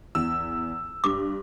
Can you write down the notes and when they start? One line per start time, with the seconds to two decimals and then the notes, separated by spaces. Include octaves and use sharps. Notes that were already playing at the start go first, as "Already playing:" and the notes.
0.15 E2 E6
1.04 G2 D6